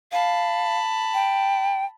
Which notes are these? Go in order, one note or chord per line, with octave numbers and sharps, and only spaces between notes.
F5 A5 B5
G5